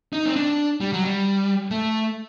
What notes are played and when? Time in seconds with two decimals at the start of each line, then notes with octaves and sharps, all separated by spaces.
0.13 D#4
0.26 C4
0.36 D4
0.81 G3
0.93 F#3
1.05 G3
1.71 A3